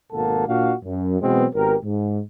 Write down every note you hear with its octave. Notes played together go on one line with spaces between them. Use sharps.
G#1 B2 A#3 A4 F#5 A5
A#2 D4 F#4 F5
F#2
B2 E3 F#3 G#3 B3 C4
G#1 B3 G4 A#4
G#2